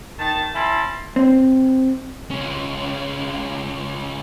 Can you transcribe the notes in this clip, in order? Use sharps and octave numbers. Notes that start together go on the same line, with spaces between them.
D#3 A5
C#4 E4 A5 B5 C6
C4
C#2 C#4